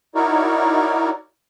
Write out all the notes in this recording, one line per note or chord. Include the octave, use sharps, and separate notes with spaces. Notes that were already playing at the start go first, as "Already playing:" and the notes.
D#4 E4 F#4 A#4 C#5 D5